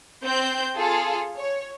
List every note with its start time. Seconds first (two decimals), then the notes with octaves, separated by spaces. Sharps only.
0.24 C4 G6
0.77 F4 G#4 A4
1.37 C#5